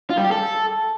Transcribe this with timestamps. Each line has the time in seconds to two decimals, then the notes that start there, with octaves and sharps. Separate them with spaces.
0.10 F4
0.17 G3
0.24 G4
0.32 A4